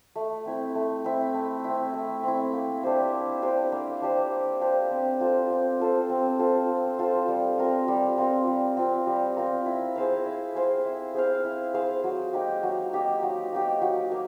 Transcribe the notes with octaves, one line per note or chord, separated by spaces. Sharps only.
A3
C4 E4
A3
C4 E4
A3
C4 E4
A3
C4 E4
A#3
D4 G4 C5
A#3
D4 G4 C5
A#3
D4 G4 C5
A#3
D4 G4 C5
C4
F4 A4 C5
C4
F4 A4 C5
C4
F4 A4 C5
C4
F4 A4 C5
G3
C4 F4 A#4
G3
C4 F4 A#4
G3
C4 F4 A#4
G3
C4 F4 A#4
E4
G#4 C5 F5
E4
G#4 C5 F5
E4
G#4 C5 F5
E4
G#4 C5 F5
F#3
A#3 D#4 G4
F#3
A#3 D#4 G4
F#3
A#3 D#4 G4
F#3
A#3